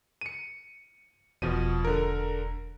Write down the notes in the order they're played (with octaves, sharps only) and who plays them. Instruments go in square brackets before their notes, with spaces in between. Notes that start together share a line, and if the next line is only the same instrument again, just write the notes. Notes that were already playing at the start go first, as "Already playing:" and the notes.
[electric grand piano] C#7 D#7
[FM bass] E1 [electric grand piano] B2 F3 D#7
[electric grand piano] D3 A#4